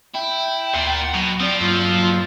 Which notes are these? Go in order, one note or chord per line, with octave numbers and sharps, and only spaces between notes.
E4 G5
D2 A#2 F#5
B2 F#3
F3 C4 D5
G2 A#2 F#3 F4